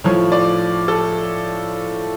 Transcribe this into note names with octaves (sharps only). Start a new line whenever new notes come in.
A2 F3 C#5
D5
A4